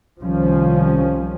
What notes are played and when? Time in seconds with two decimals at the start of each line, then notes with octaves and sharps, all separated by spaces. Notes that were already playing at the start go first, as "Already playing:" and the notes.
0.23 C2 D#3 F3 G3 C#4